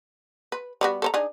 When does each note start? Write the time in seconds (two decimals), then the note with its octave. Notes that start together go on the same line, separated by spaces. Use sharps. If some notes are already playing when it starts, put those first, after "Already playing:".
0.52 B4
0.81 G3 B3 F#4
1.02 A4 C5 A#5
1.14 D4 D#4 G#4